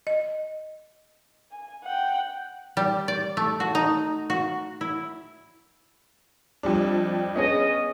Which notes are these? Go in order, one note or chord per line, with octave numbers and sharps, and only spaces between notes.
D#5
G#5
F#5 G5
G3
D5
A3
F#4
D#4
F#4
E4
F2 G3 D4
B3 C#4 G#4 D#5